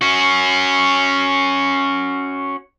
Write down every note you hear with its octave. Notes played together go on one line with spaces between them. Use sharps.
C#4 F#4